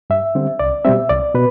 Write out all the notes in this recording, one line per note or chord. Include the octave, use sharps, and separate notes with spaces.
G2 E5
D3 G3 C4
C2 D5
B2 G3 C4 E5
C2 D5
B2 B4